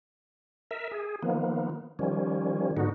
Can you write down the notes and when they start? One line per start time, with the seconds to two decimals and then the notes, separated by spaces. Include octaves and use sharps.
0.71 A#4 E5
0.91 G#4
1.23 D#3 F3 A#3 B3
1.99 D#3 F3 G3 C#4
2.77 G#2 D3 B3 D#4 F#4